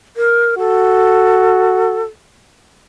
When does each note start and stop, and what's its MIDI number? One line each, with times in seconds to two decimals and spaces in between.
0.17 0.55 70
0.59 2.04 66
0.59 2.03 69